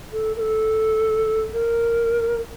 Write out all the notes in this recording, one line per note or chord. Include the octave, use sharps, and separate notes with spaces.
A4
A#4
A4
A#4